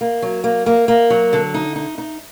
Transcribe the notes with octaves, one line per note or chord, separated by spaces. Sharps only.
A#3
F#3
A#3
A#3
A#3
F#3
D3
D#4
D#4
D#4